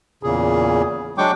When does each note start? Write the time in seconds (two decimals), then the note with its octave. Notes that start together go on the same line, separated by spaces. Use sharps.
0.23 E2 A#2 C#3 G#4
1.18 F#3 G#3 D4 G5 C#6 D6